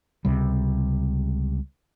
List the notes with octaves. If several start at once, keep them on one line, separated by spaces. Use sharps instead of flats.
C#2 C3 G3